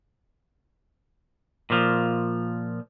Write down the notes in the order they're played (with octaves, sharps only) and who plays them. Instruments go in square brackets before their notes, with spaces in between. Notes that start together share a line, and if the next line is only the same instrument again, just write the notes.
[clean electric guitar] A#2 F3